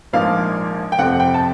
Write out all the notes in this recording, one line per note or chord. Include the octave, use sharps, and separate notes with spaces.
A#1 G#2 F3 A#3 D4 F5
G5
G1 F2 C3 F3 F#5
G5
A5